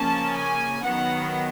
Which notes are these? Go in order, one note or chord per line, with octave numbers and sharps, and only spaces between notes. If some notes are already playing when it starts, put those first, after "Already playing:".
Already playing: C#3 F3 A#3 C#4 A5
G#5
D#3 F#3 B3 F#5